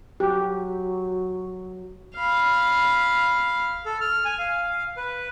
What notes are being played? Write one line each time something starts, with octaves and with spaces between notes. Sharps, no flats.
F#3 G4
F5 B5
A4
F6
G#5
F5
B4